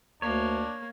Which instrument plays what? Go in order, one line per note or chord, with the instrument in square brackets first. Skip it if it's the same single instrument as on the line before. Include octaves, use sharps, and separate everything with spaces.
[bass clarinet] D2 [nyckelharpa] A#3 [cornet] D4 [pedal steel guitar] C#5